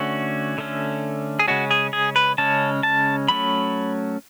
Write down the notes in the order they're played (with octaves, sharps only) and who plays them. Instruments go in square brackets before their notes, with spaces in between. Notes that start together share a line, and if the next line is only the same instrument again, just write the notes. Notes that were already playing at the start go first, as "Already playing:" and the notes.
Already playing: [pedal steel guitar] D3 A3 C#4 F#4
D3 A3 C#4
G#4
C#3 G#3 C#4 F#4
G#4
G#4
B4
C#3 G#3 C#4 A5
A5
F#3 A3 C#4 B5